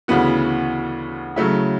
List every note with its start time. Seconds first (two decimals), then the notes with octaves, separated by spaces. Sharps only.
0.08 D2 C#3 E3 B3 F#4
1.36 C#3 F#3 A3 E4